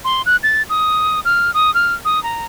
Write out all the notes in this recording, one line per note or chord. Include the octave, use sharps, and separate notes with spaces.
C6
F#6
A6
D#6
F6
D#6
F6
D#6
A#5